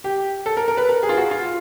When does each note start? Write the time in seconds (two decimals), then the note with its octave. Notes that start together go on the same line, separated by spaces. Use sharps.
0.04 G4
0.46 A4
0.57 A#4
0.68 A#4
0.77 B4
0.89 A#4
1.03 G#4
1.09 F4
1.17 F#4
1.31 F4